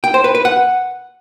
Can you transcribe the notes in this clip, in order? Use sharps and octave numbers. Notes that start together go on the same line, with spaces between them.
G5
C5
B4
B4
F#5